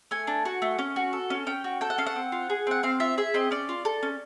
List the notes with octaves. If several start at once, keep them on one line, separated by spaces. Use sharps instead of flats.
A3 G#5
D4
F#4
A3
C#4
F#4
A4
C#4
C#4 G5
F#4
A4 G5
F#5
C#4 F5
F#5
C4
F4
G#4
C4 F#5
C4 F5
F4 E5
G#4 E5
C4 D#5
C#4 D5
F4
A4
C#4